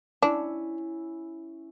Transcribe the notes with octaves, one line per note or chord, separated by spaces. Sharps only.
C#4 D4 E4